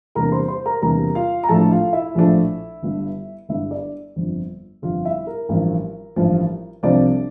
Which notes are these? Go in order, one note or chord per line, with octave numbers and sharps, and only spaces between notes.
E2 C3 G3 A#3 D4 A#4 A#5
C5 C6
C5 C6
A#4 A#5
E2 C3 G3 A#3 D4 A#4 A#5
F4 F5
A#5
A#1 A2 F3 A3 D4 A4 A5
F4 F5
E4 E5
A#1 A2 F3 A3 D4
G1 G2 D3
G1 G2 D3 E4 E5
D4 D5
G1 F2 D3
G1 F2 D3 F4 F5
E4 E5
A#4
A1 G2 F3 A#4
A1 G2 F3
C2 C3 F3 C4 D4 D5